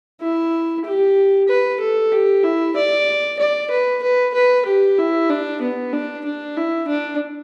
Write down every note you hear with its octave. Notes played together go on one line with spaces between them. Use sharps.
E4
G4
B4
A4
G4
E4
D5
D5
B4
B4
B4
G4
E4
D4
B3
D4
D4
E4
D4